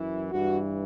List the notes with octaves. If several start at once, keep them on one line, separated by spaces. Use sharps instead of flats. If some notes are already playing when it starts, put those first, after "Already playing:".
Already playing: F#2 E3 E4
G2 E3 F#4